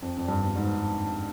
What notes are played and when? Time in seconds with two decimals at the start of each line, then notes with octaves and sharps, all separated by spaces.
0.02 F2
0.17 F2
0.28 G2
0.43 B2
0.55 G#2